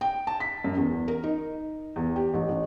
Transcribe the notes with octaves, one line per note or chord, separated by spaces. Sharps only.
G5
A5
B6
F#2
E2
A#4
D#4
E2
G4
A1
A1